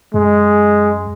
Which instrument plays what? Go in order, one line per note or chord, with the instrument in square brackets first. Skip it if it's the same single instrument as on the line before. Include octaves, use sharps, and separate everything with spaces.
[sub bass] F#2 [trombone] G#3